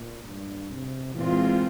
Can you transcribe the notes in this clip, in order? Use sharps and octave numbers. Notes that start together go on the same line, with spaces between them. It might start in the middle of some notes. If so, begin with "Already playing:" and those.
Already playing: A#2
G2
C3
A#2 E3 G#3 C4 F4